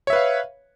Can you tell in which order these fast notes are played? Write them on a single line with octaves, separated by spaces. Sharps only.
C#5 E5 B4 F5